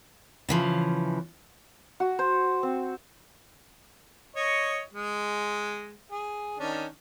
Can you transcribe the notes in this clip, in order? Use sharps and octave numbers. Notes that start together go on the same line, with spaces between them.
C#3 E3 F3
F#4
C5
C4
C#5 D#5 C#6
G#3
G#4
D#3 C#4 D4